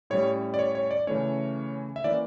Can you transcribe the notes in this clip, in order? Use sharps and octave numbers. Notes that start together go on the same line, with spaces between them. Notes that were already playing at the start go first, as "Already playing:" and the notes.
A2 G3 C#4 C#5
D5
C#5
C#5
D5
C#3 E3 A3 C#4 C#5
E5
E3 A#3 C#4 D5